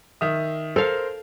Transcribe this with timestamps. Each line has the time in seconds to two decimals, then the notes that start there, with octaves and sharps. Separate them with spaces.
0.21 D#3 E5 D#6
0.76 A4 A#4 C5 F5 F7